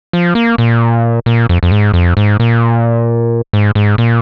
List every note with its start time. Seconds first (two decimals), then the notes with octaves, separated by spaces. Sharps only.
0.13 F3
0.35 A#3
0.58 A#2
1.26 A#2
1.49 F2
1.63 F2
1.71 G#2
1.94 F2
2.17 G#2
2.40 A#2
3.53 G#2
3.75 G#2
3.98 A#2